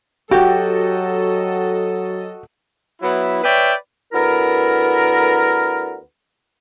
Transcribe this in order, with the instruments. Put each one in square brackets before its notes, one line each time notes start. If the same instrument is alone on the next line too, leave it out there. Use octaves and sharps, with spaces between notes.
[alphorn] F#3 [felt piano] F#4 G5 [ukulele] G4 [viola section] A4 D#5
[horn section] F#3 B3 E4
B4 C#5 D5 E5 G5
[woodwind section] D2 B3 E4 A#4